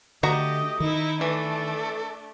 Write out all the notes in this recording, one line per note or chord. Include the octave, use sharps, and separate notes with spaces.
D3 A3 F#4 G4 D#5 A#5 D#6
D#3 D#4 E4
E3 A3 D4 A4